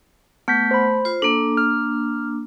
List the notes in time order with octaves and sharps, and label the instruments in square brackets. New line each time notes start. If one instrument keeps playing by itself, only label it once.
[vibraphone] A3 [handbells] B3 G6 B6
[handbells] C5 B5
[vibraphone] F4 C5
[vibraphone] A#3 D4 [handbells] A4
[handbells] F6